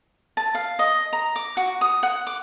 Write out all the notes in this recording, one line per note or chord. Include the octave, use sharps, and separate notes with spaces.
A5
F5
D#5
A#5
D6
F#4
D#6
F#5
D6